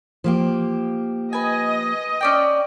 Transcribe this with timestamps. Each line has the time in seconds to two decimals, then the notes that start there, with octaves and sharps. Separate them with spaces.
0.24 F3 A#3 G4
1.33 B4 D#5 G#5
2.21 C#4 D5 G5